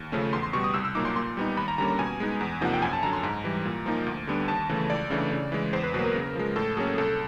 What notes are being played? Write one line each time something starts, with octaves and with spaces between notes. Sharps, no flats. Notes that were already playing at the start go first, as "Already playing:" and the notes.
Already playing: D#2
C#3 F3 A3 C#4
E2 C6
C6
B2 G3 C#6
D#6
C2 E6
E6
A#2 F#3 A#3 D#4 D6
C6
A#2 C6
G3 B3 D#4
D#2 B5
A#5
D3 G3 A#3 C#4 A#5
A#5
B2 G#5
G#3 B3 D#4
E2
C3 F3 A#3 D#4 F#5
G5
F#2 G#5
A5
D3 F#3 A#5
C6
G#2 A#5
E3 G3
A#2
F3 A#3 D#4
D2
D3 G3 B3 D4
D#2 A5
C#3 E3 A3
C#2 D5
C#3 E3 A3 D4
C#3
E3 G#3
E2 C5
B4
B2 F#3 A#3 B4
A#4
C#3
F3 G#3
A2 A4
F#3 A#3 C#4 G#4
C2 A4